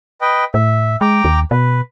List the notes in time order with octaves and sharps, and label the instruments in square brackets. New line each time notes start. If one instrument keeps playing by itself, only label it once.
[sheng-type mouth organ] B4 D#5 G5
[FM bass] A2 [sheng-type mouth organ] E5
[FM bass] G#3 [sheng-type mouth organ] G5 A#5 D6
[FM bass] D#2
[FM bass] B2 [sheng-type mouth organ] B4